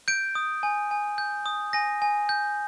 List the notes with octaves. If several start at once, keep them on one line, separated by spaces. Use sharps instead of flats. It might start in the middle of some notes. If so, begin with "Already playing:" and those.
G6 D7
D#6
G#5
G#5
G6
D#6
G#5 A#6
G#5
G6